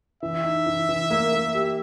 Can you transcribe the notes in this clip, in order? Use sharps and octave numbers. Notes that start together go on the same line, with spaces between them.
E3 E5
D#4
E3
E3
A#3
A#3
G4